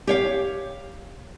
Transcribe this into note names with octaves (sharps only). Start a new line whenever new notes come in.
G4 C#5 F5